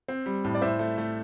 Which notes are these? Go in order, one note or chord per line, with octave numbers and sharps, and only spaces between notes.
C4
G3
A2
D5
A2 C5 E5
A3
A3